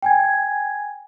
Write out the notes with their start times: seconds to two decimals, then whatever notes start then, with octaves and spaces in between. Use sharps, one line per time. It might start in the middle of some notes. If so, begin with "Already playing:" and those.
0.02 G5 G#5 G#6